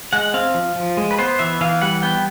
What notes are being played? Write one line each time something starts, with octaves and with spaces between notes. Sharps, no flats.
G#3 F#5
C4 F5
F3
F3
G#3
B4
B3 C5
E3 E5
E3 F5
G3 F#5
B3 G5